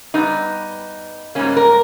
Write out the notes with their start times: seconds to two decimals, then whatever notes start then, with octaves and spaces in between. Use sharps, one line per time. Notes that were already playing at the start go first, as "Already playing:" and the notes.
0.14 G2 G3 B3 D#4
1.35 G#2 G3 A#3 C#4
1.57 A#4